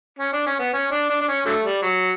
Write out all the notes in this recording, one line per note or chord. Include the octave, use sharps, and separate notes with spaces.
C#4
D4
C#4
B3
C#4
D4
D4
D4
C#4
D3 F#3 A3
G3
F#3